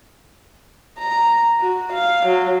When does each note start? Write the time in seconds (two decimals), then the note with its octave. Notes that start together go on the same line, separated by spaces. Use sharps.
0.98 A#5
1.60 F#4
1.93 F5
2.26 F#3